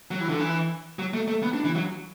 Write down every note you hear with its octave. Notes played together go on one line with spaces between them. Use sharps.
F#3
E3
D3
E3
F#3
A3
A3
B3
D4
E3
F#3